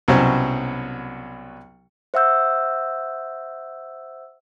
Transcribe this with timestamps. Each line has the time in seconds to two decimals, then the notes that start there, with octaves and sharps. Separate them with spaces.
0.08 C2 B2 F#3 C#4 C5 F#5
2.14 C5 E5 F#5 E6 G6